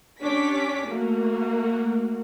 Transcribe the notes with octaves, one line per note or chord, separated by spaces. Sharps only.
C#4 D4 G4 D6 B6
A3 A#3 F#4